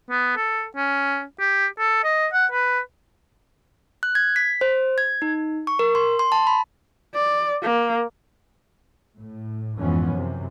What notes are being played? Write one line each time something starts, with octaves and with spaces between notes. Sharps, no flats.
B3
A4
C#4
G4
A4
D#5
F#5
B4
F#6
G#6
B6
C5
G#6
D#4
C#6
A#4
C6
C6
A5
B5
D5
A#3
A2
F2 G#2 E3 F3 B3 C#4
F#2 C3 E3